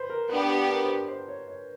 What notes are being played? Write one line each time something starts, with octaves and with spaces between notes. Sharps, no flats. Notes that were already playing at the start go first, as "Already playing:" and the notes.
Already playing: B4 C5
A#4
B3 D4 G4 B4
B4
A#4
C5
B4
C5
C#5
C#5